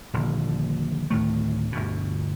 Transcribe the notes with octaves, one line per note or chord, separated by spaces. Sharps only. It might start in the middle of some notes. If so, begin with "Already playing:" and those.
D#1 A#1 D3
D2 A2 D#3 A3
G1 D2 B2